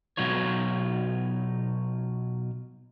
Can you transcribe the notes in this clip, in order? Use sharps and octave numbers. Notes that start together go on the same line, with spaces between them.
B2 F#3 D#4 F4 C#5